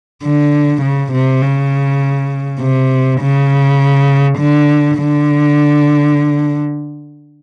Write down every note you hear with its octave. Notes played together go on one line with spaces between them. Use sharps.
D3
C#3
C3
C#3
C3
C#3
D3
D3